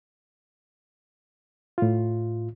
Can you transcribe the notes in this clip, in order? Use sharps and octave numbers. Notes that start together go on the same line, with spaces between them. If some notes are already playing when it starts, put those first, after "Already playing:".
A2 F4